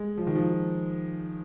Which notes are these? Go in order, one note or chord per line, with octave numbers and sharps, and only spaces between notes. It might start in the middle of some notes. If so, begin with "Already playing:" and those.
Already playing: G#3
F3
D#3
F3